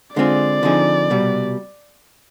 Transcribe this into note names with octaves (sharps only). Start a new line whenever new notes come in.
D3 G#3 C4 F4 G#4 D5
D3 F3 C4 D#4 G#4
C2 B2 G3